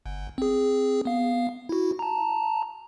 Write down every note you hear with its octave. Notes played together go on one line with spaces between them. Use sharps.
G1
C4 G#4
B3 F5
E4 F#4
A5 A#5